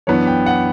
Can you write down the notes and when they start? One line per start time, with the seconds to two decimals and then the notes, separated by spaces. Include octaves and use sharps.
0.07 F#2 E3 B3 D4 C#5
0.27 G5
0.46 F#5